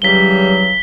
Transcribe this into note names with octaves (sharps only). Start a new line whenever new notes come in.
C#3 E3 F#3 G3 B6 G7